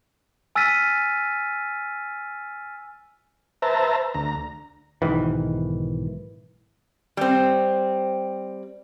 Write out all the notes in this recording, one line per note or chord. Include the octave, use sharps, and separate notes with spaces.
G#5 E6 F6 A6 B6 D#7
B4 C5 E5 A5 A#5
D2 A#5
B1 G#2 D#3 E3
G3 C4